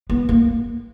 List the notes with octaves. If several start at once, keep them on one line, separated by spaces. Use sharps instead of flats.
B3
A#3